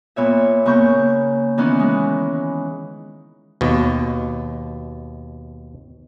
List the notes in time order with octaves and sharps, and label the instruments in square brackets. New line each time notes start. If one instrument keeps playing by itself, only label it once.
[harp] A#2 B3 C#5 E5
C#3 A#3 B3 C#6 G6
D#3 E3 B3 C#4
G#3
[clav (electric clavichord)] D#2 B2